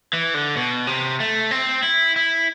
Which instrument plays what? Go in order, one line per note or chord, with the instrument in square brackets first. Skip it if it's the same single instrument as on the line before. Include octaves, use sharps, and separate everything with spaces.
[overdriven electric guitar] E3
D3
B2
C3
A3
C4
E4
E4